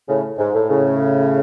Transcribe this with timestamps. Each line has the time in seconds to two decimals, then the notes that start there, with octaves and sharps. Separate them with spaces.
0.07 A2 C#3
0.38 G#2
0.53 A2
0.69 A2 C#3